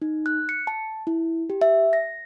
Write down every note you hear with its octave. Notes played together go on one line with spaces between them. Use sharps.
D#4
F#6
C#7
A5
E4
G4
E5
A#6